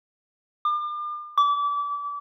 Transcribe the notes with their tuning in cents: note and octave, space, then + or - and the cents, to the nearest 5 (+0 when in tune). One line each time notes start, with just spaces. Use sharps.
D6 +40
D6 -30